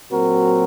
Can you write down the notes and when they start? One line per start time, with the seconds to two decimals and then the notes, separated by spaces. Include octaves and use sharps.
0.10 A#2 F#3 C4 F#4 A#4